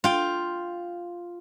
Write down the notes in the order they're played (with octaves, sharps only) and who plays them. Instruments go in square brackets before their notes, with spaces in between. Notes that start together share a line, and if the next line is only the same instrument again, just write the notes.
[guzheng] F4 G5